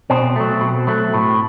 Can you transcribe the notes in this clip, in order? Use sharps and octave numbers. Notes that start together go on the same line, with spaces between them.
B2 C4
F#3 A3
B2
F#3 A3
A2